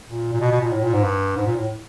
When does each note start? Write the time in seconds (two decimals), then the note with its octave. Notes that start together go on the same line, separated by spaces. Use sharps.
0.09 A#2
0.32 A#2
0.41 B2
0.52 B2
0.61 A#2
0.72 A2
0.84 A#2
0.94 G#2
1.04 G2
1.37 G#2
1.46 A#2
1.57 A2